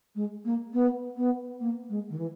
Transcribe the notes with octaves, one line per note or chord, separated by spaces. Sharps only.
G#3
A#3
B3
B3
A#3
G#3
D#3
E3